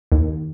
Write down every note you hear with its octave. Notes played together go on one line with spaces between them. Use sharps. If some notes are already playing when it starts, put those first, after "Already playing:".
D#2